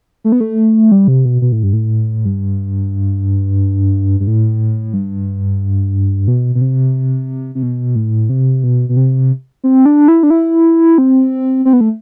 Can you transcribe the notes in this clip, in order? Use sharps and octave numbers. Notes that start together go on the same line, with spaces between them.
A3
B3
A3
G3
C3
B2
B2
A2
G2
A2
G2
G2
A2
G2
B2
B2
C3
C3
B2
A2
C3
B2
B2
C3
C4
D4
E4
D4
E4
C4
C4
B3
A3